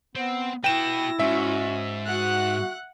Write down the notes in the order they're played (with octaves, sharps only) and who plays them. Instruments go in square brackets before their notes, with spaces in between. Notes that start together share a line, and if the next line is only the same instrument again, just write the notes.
[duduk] B3 [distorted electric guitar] C4
[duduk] E4 [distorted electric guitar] F#4 B4 [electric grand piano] G5 E7 [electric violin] A#6
[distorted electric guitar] G#2 [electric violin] C#4 F#4 [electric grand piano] E5
[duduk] F#4 [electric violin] F#5 F#6